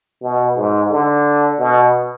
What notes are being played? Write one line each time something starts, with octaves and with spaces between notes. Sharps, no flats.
B2
G#2
D3
B2